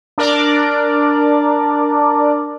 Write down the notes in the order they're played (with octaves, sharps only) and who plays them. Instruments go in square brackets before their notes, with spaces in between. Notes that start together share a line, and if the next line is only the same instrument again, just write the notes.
[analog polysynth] D4 A#4 D5